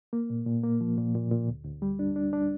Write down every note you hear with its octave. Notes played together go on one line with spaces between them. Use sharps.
A#3
A#2
A#2
A#3
F3
A#2
A#2
A#2
D2
D2
G3
D4
D4
D4